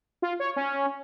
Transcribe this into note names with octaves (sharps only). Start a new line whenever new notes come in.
F4
C#5
C#4